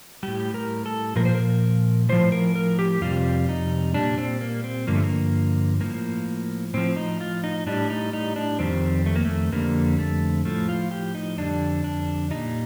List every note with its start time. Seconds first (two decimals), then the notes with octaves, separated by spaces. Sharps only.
0.23 A2 G3 G4
0.54 A#4
0.86 A4
1.16 A#2 F3 A#4
1.25 C5
1.35 A#4
2.09 A2 F3 C5
2.32 A#4
2.55 A#4
2.79 G4
3.01 F2 C3 G3 F4
3.49 D#4
3.94 A#2 G3 D4
4.18 C4
4.41 A#3
4.64 C4
4.87 G2 D3 F3 A#3
4.95 A3
5.04 A#3
5.80 A2 F3 A#3
6.74 A2 F3 C4
6.96 D#4
7.21 F4
7.44 D#4
7.66 A2 G3 D4
7.90 D#4
8.13 D#4
8.36 D4
8.59 F2 D#3 G3 C4
9.06 A3
9.16 A#3
9.25 A3
9.52 F2 D3 G3 A#3
9.99 A3
10.45 A2 F3 A3
10.69 F4
10.91 G4
11.15 D#4
11.38 F2 D3 G3 D4
11.84 D4
12.31 A#2 G3 D#4